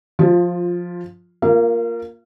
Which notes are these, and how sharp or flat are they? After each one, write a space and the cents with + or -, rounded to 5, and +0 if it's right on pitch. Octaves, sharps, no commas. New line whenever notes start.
F3 +15 F4 +0
A#3 +0 F4 +0 F5 -35